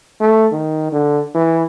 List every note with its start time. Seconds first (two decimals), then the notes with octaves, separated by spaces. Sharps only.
0.20 A3
0.51 D#3
0.92 D3
1.35 E3